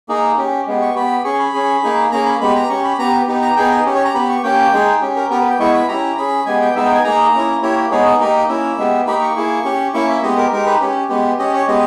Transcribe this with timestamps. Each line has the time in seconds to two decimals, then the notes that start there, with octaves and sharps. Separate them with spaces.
0.09 A#3 D#4 G#4
0.38 C#4 G4
0.67 G#3 B3 G4
0.82 C#6
0.96 B3 G4 B5
1.24 C#4 G#4 C#6
1.40 B5
1.54 C#4 G#4
1.83 A#3 D#4 G#4
2.12 A#3 C#4 G#4 A#5
2.26 B5
2.41 G#3 B3 G4 B5
2.56 A#5
2.69 C#4 G4 C#6
2.84 B5
2.99 B3 G4 A#5
3.27 B3 D#4 G4
3.42 A#5
3.56 B3 D#4 G#4 G5
3.71 D#5
3.86 C#4 G4
3.95 C#5
4.05 A#5
4.14 B3 G4 B5
4.30 C#6
4.43 A#3 C#4 G4 G5
4.73 G#3 D#4 G#4
5.02 C#4 G4
5.16 A#4
5.30 B3 G4 A#4
5.40 B4
5.50 G5
5.59 G#3 B3 E4 C#6
5.74 B5
5.88 C#4 E4 G4 A#5
6.17 C#4 G#4 B5
6.46 G#3 B3 G4 G#5
6.61 G5
6.75 G#3 B3 D#4 E5
6.85 G5
6.95 G#5
7.04 A#3 D#4 G#4 A#5
7.33 A#3 C#4 E4
7.62 A#3 E4 G4 C#5
7.91 G#3 B3 D#4 G#4 C#5
8.05 D#5
8.20 A#3 D#4 G4 D#5
8.49 A#3 C#4 E4 E5
8.78 G#3 B3 G4
9.07 A#3 D#4 G4 B5
9.22 C#6
9.36 A#3 E4 G#4
9.65 C#4 G4
9.94 A#3 C#4 E4 C#6
10.09 E5
10.23 G#3 B3 G4 D#5
10.37 A#4
10.52 G#3 D#4 G4 A#4
10.66 B4
10.81 C#4 G4
11.09 G#3 B3 G4
11.39 C#4 G4 D#5
11.53 C#5
11.68 G#3 B3 G4 D#5